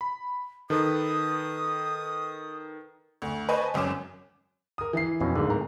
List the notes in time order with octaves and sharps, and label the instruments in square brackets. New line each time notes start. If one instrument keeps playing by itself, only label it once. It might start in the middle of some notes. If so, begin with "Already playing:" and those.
[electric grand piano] B5
[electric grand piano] D#3 A4 B4 [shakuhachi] D#6
[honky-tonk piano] D2
B4 C5 D#5 G#5 A5 C#6
G#1 F#2 C#4 D6 E7
[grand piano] A#4 D#6
E3 E5 C7
[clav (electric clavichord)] F2 B2 C#4
[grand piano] D1 G#2 [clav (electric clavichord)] D3 A#3
[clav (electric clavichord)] A#4